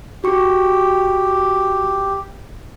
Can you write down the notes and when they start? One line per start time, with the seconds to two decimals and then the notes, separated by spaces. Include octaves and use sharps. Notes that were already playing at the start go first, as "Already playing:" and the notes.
0.24 F#4 G4 C#6 C#7